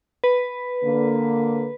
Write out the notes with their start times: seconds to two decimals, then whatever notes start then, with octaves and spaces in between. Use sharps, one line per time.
0.24 B4
0.84 D3 A#3